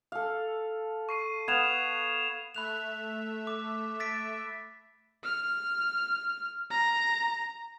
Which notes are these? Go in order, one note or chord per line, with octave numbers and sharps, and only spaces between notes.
A4 F5
C#6 C7 D#7
B3 F5 G#6 E7 F7
A3 E5 B5 F#6 F7
D6
A6 B6 D7
F6
A#5